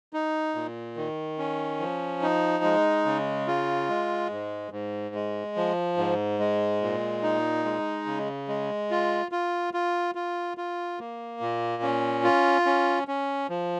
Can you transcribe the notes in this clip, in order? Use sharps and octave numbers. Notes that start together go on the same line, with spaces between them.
D#4
A#2
D#3
C#4
F3
D#4
G#3
C#3
F4
G#3
G#2
G#2
G#3
F3
G#2
G#3
A#2
D#4
G#3
C#3
G#3
F4
F4
F4
F4
F4
A#3
A#2
C#4
F4
C#4
C#4
F3